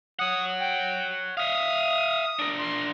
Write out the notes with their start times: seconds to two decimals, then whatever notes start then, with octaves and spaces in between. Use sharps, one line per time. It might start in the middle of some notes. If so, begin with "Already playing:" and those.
0.19 C#5 F#5 D#6
0.59 G5
1.37 E5 F5 D#6
2.39 D4 A#4
2.58 C6